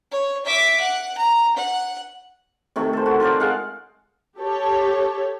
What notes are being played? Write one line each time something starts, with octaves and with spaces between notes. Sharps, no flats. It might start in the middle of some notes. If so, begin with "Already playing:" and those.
C#5
E5 D6
F#5
A#5
F#5
C3 D#3 A3
A4 C5
F#4
F4 A#4 C5 D5
G#3 F5 F#5
G4 A4 C#5